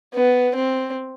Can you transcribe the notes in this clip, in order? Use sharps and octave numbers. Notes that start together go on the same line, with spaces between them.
B3
C4